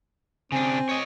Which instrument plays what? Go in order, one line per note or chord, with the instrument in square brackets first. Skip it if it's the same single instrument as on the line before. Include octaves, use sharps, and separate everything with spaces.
[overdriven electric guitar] C#3 D4 [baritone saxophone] C4 [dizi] G#5
[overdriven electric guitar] C#5 D#5